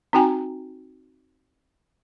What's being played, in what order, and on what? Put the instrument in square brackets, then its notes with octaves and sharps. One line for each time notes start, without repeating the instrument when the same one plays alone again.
[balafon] C4 D#4 F#4 G5 G#5 A#5